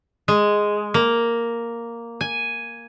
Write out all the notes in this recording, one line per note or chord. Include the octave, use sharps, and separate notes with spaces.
G#3
A#3
G#5